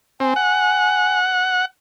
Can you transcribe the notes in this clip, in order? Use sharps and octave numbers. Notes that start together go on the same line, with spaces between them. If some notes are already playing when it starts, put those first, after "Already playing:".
C4 G#5
F#5